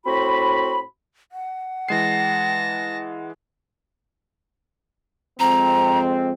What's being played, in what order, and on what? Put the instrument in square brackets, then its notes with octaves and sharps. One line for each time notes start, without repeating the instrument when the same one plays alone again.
[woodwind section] A2 C4 F#4 B5
[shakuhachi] F#5
[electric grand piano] E3 G#3 C7 [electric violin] A5 A#6
[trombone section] F2 G#3 C4 [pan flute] A#5